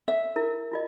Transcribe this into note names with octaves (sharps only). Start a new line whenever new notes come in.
E5
E4 A#4
E4 F4 D#5